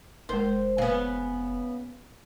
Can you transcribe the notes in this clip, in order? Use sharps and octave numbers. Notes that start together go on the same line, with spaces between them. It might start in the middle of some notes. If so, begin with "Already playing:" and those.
F1 G#3 A#4 C5
C#3 B3